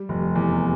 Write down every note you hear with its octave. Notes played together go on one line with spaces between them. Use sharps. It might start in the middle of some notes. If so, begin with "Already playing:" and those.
Already playing: G3
F1
E2